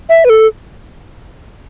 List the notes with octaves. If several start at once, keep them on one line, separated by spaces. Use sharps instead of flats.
E5
B4
A4